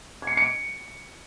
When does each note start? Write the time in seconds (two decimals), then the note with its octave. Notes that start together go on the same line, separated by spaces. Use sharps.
0.22 G#6
0.27 C#7
0.32 C7
0.37 C#7
0.42 D7